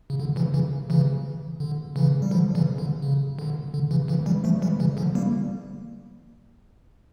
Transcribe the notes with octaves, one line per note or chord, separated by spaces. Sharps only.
C#3
D3
C#3 E3
C#3 E3
C#3 E3
D3
C#3 E3
G3
D3 F3
C#3 E3
D3
C#3
D3
D3
C#3 E3
C#3 E3
E3 G3
F3 A3
E3 G3
C#3 E3
D3 F3
G3 A#3